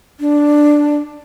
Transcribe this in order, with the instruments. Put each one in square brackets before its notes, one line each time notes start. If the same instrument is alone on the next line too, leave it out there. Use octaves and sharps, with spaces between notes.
[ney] D4